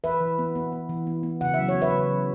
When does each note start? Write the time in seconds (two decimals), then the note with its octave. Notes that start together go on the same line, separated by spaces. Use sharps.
0.04 E3 B4 E5
0.21 E3
0.39 B3
0.55 B3
0.72 B3
0.89 E3
1.07 B3
1.23 B3
1.41 C#3 F#5
1.54 F#3 E5
1.69 C#5
1.74 B3
1.82 B4 E5
1.92 C#3
2.10 F#3